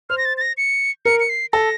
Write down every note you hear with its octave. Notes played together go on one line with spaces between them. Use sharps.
C5 F6
A#6
A6
A6
A#6
C#7
A#4 C#7
C#7
C7
A4 A#6